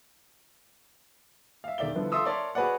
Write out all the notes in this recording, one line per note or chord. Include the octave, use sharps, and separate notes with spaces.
E5 F5
E1 D#3 D5 E5 G7
D3 F3 B3 E4
F4 A4 E5 C6 D#6 E6
A#4 C#5 D5 E5 A5 C6
F#4 G#4 B4 C#5 D5 F#5